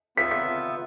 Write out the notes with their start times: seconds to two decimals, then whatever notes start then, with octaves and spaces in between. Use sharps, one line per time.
0.17 B3 F4 B4 E5 B6
0.31 B6